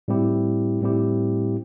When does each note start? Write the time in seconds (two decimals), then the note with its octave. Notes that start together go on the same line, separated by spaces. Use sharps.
0.08 A2 G3 C4 E4 G4
0.82 A2 G3 C4 E4 G4